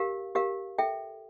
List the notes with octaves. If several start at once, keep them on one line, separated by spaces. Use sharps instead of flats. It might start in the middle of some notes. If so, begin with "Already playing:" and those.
Already playing: G4 A#4 F5
G4 A#4 F5
A4 E5 G5